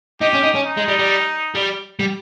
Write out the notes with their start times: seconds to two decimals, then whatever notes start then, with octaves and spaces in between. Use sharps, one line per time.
0.21 D#4 G4
0.33 C#4
0.44 D#4
0.55 C#4
0.66 D#4
0.77 G#3
0.88 G3
0.99 G3
1.55 G3
2.00 G3